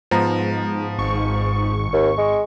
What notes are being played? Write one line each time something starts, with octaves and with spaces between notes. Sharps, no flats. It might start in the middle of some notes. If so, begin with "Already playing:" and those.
G#2 F3 B3 A#5
G#1 C#6
D#2
G#3